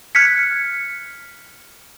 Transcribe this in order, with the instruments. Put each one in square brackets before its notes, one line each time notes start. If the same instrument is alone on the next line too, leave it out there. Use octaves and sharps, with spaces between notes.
[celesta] F6 F#6 G#6 B6 C#7